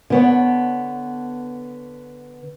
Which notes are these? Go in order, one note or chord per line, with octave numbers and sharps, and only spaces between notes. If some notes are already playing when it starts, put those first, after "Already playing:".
D3 B3 C#5